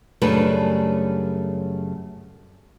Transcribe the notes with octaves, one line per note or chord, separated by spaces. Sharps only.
F#2 C#3 G3 A3 D4 B4